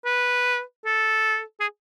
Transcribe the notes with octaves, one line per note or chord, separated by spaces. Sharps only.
B4
A4
G#4